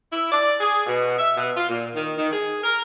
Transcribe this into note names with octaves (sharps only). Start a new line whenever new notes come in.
E4
D5
G#4
B2
E5
B2
F4
A#2
D#3
D#3
G#4
A#4